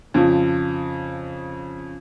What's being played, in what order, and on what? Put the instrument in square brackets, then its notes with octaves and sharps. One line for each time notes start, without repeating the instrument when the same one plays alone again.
[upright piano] F2 C#3 F3